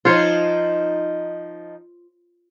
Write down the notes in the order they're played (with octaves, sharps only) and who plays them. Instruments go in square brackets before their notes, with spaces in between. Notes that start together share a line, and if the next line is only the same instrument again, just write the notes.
[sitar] F3 D#4 [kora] F4 C5 C#5